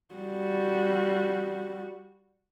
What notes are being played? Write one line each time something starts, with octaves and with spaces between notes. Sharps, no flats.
G3 F#4